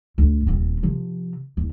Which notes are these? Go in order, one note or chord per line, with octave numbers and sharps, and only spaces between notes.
D2
D#1 C4
C3 F3
D#2